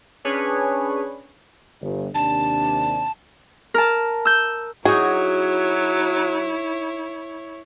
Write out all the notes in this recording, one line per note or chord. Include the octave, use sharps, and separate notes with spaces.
C#4 D4 G#4 B4 C#5
G1
D#2 C3 D4 A5
A#4 A5
E6 G6
F#3 D#4 E4 F#4 G#4 C#5